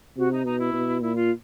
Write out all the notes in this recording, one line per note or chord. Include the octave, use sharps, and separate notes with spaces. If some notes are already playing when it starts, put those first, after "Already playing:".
C3 F#4
D#4
B2 D#4
E4
B2
A#2 E4
F4